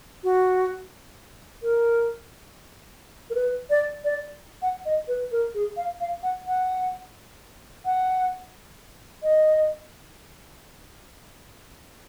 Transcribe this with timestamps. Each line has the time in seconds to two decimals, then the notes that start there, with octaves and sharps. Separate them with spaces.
0.24 F#4
1.63 A#4
3.30 A#4
3.35 B4
3.70 D5
4.04 D5
4.62 F#5
4.85 D#5
5.08 B4
5.32 A#4
5.54 G#4
5.77 F5
6.00 F5
6.23 F#5
6.47 F#5
7.85 F#5
9.23 D#5